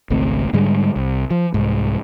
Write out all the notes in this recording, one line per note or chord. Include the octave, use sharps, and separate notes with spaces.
G#1 C#2 A3 C4
G#2 D3 G3 G#3
C2
F3
C2 G#2